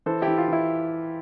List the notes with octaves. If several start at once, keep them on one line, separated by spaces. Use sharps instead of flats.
E3 A4 C5
E4 G4
E3
F4
E3 E4